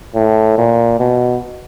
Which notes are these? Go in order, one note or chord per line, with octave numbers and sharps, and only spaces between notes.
A2
A#2
B2